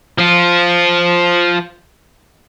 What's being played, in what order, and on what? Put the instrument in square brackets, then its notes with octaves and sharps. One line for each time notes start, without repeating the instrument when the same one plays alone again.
[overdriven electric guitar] F3 F4